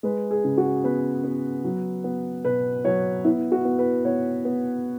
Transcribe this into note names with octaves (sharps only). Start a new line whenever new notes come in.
G#3 B4
G#4
C#3
F#4
B3 B4
B3
F#3
B3
B2 B4
F#3 C#5
B3 E4
F#4
B3
B4
B3 C#5
B3